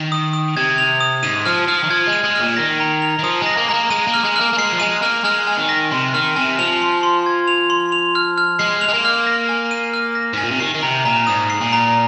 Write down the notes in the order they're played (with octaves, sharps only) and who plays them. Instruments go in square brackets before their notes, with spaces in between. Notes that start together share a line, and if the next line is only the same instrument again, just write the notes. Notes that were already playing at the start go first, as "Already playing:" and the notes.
Already playing: [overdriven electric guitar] D#3
[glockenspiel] D#6
D#6
[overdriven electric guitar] C3 [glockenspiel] G#6
[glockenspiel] F7
D#6
[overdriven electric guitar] G#2 [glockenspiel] D#7
[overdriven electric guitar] F3 [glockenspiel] F6
[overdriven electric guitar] F3 [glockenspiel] F6
[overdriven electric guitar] D#3
[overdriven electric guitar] F3 [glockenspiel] G#6
[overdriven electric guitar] G#3
[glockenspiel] D#7
[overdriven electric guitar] G#3
[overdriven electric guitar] A#2 [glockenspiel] F6
[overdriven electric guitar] D#3 [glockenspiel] A#6
[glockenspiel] A#5
F7
[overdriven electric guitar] D#3
[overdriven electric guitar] F3 [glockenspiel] D#6
[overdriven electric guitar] G#3 [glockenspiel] A#6
[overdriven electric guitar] A#3
[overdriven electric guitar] G#3 [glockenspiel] A#5
[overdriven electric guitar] A#3
[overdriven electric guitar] G#3 [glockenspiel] D#7
[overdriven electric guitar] A#3
[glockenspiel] F6
[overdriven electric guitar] G#3
[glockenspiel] F6
[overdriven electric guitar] A#3
A#3
[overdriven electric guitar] G#3 [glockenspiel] C7
[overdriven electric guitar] F3
[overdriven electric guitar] G#3 [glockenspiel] D#7
[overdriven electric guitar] A#3 [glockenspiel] F6
[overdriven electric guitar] G#3 [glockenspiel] F6
[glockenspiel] G#5
[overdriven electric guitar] D#3
[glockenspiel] A#6
[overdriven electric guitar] C3 [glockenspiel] C6
[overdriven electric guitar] D#3 [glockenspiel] F6
[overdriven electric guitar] C3 [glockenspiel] G#5
[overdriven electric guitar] F3 [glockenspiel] F7
[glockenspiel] C6
C6
G#6
F7
C6
F7
F6
F6
[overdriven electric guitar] G#3 [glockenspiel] C7
[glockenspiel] F7
[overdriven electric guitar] G#3
A#3
[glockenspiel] F6
A#6
G#5
D#7
F6
A#6
[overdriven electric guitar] G#2
[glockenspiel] G#5
[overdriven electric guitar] A#2
C3
[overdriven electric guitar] D#3 [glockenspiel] C7
[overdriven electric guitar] D#3
[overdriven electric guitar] C3 [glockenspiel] A#5
[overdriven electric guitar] A#2 [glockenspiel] A#5
[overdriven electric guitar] G#2 [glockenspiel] D#6
[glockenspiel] C7
[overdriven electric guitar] A#2
[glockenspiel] A#5